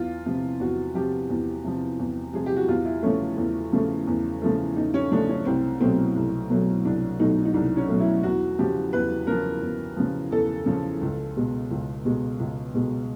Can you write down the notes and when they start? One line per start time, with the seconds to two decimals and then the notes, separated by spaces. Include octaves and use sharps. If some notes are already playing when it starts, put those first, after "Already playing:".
Already playing: E2 F4
0.26 C3 F3
0.60 E2 F#4
0.95 C3 F3 G4
1.29 E2
1.64 C3 F3
1.99 E2
2.33 C3 F3 G#4
2.46 G4
2.57 F#4
2.68 E2 F4
2.85 E4
3.02 C#3 F3 A3 C#4
3.38 E2
3.72 C#3 F3 A3
4.07 E2
4.42 C#3 F3 A3
4.76 E2 D#4
4.94 C#4
5.12 C#3 F3 A3 D4
5.29 C#4
5.45 C2 C4
5.80 B2 F#3 A3 C4
6.15 C2
6.50 B2 F#3 A3
6.85 C2 D4
7.19 B2 F#3 A3 D#4
7.45 D#4
7.54 C2 D4
7.77 C#4
7.88 B2 F#3 A3
8.00 E4
8.23 E2 F#4
8.59 C#3 F3 G4
8.93 E2 B4
9.27 C#3 F3 A#4
9.62 E2
9.96 C#3 F3
10.31 E2 A4
10.66 C#3 F3
11.01 C#2
11.36 B2 G#3
11.71 C#2
12.05 B2 G#3
12.39 C#2
12.74 B2 G#3